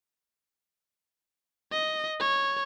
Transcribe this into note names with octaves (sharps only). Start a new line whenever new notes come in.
D#5
C#5